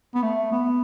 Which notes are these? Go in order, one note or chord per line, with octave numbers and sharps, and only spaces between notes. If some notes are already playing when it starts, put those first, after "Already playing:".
B3
A3
B3